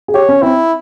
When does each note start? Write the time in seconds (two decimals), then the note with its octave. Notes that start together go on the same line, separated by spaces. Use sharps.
0.08 G#4
0.14 G4 C#5
0.29 C#4
0.42 C4 E4